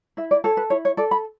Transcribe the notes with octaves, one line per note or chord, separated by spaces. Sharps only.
E4 E5
D5
A4 C#5
B4
E4 C#5
C#5
A4 D5
B5